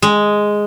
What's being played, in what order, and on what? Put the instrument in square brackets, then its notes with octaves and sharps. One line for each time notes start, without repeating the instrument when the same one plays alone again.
[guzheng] G#3